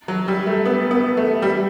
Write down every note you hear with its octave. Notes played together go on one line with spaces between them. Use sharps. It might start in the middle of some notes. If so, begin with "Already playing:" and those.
F#3
G3
A3
B3
B3
A3
G3